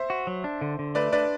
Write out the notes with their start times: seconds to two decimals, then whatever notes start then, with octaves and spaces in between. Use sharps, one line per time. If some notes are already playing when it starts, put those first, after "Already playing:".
Already playing: C5 E5
0.10 F#4
0.27 F#3
0.44 D4
0.61 D3
0.79 D3
0.95 A3 B4 D5
1.12 D4 B4 D5